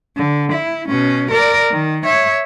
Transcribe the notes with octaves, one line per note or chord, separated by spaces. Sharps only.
D3
E4
B2 C#4
A#4 D5
D#3
C#5 E5